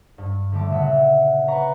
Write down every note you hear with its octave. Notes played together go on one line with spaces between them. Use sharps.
G2
D3 G3 A3 D6
A#2 C#3 E5 F#5
B4 F#5 A#5 C#6